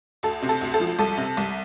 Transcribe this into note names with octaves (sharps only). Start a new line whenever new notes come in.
D2 A4
C3
A4
D2
A4
F3
C2 A4
C3
C2